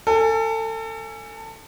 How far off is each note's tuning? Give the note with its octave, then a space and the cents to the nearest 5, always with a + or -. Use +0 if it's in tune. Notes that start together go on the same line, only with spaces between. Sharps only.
A4 +30 G#5 +0